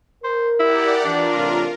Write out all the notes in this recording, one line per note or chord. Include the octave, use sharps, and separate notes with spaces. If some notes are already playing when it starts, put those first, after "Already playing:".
A#4 C5
E4 G4 D5 F#5
E3 D4 F4 A#4
A2 C3 E3